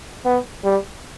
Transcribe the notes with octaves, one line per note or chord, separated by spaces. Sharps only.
B3
G3